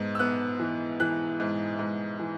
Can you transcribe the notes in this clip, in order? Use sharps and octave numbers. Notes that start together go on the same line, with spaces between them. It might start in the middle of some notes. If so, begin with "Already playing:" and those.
Already playing: G#2 B3
E6
B3 F#6
E3
E3 F#6
G#2
G#2
E3